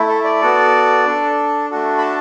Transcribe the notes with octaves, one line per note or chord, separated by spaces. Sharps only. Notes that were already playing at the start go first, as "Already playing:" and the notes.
Already playing: A3 E4
A4
D5
B3 F#4 A4
D4 A4
A3 D4 F#4 A4
B5
A5